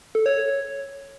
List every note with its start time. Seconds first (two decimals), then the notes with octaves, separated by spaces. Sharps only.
0.15 A4
0.26 C#5
0.36 C#5